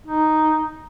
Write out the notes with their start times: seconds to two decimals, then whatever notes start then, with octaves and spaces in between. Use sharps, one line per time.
0.07 D#4